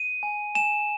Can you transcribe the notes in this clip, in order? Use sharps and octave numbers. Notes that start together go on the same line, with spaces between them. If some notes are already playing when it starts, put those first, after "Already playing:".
Already playing: D#7
G#5
G#5 E7